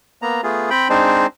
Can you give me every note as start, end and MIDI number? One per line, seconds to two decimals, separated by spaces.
0.22 0.41 58
0.22 0.41 59
0.22 0.41 82
0.43 0.70 57
0.43 0.70 59
0.43 0.70 65
0.43 0.70 68
0.70 0.88 60
0.70 0.88 79
0.70 0.88 83
0.89 1.26 56
0.89 1.26 60
0.89 1.26 62
0.89 1.26 63
0.89 1.26 72